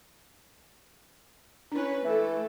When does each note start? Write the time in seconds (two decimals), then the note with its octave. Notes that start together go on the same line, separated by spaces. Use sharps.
1.72 C#4 D4 E4 B4
2.05 E3 A3 A4